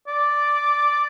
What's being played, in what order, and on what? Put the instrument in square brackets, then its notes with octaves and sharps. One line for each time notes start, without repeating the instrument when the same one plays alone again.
[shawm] D5